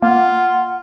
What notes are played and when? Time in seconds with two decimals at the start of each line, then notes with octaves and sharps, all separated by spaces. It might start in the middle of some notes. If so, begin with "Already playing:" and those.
0.02 A#3 F4 F#5